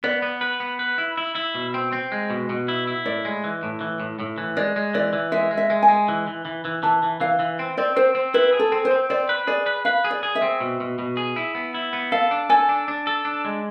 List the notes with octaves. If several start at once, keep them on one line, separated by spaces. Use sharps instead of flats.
B3 D5
B3
B4
B3
B4
E4
E4
E4
B2
C4
C4
G#3
B2
B2
E4
E4
A2 D5
G#3
E3
A2
E3
A2
A2
E3
G#3 D5
G#3
E3 D5
E3
G#3 E5
G#3
E5
G#3
G#5
G#3
E3
E3
E3
E3
E3 A5
E3
E3 F5
E3
C4
C4 D5
C4 C5
C4
E4 B4
G#4
A4
C4
C5
C4
C4 D5
B4
G#4 D5
B4
B4 F5
G#4
D5
G#4
E5
C4
B2
B2
B2
G#4
E4
B3
E4
B3
A4 F5
D4
A4 G#5
D4
D4
A4
D4
G#3